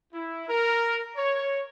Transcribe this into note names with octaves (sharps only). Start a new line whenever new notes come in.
E4
A#4
C#5